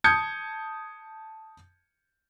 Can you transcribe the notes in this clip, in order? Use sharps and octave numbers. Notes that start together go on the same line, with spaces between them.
A5 D#6 G6 G#6 C#7